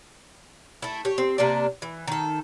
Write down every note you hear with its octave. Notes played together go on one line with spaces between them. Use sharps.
A3 E4
G4 C#5
C4
C3 A#3 D4 D5
E3
D#3 A4